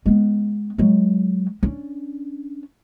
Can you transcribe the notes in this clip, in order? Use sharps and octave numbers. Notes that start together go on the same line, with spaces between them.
G#3 B3
F#3 G#3
C#4 D4